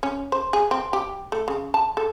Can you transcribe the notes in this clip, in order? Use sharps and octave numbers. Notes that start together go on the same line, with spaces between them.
C#4
C5
G#4
C4
G4
A3
C#3
A5
A4